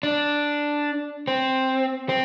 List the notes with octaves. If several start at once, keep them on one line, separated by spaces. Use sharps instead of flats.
D4
C4
C4